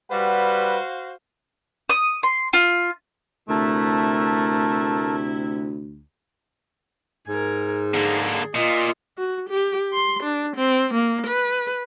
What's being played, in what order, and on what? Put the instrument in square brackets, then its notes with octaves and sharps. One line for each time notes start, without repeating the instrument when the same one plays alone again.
[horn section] G3 B4 [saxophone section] F#4 C5 F5 [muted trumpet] F#5
[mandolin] D#6
C6
F4
[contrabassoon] D2 [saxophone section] C3 E4 [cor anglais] A3 [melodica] A#4 A5
[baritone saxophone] G#2 [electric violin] A#4 G#5
[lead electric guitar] D3 A#3 [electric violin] G#4
[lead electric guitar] A#2 [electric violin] F4 D#5
[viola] F#4
G4
C6
D4
C4
A#3
B4